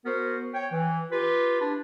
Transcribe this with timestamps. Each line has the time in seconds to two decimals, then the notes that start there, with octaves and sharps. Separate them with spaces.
0.06 B3 F#4 A#4 C5
0.54 C#5 G5
0.72 E3
1.12 F4 G4 B4
1.60 D4 E4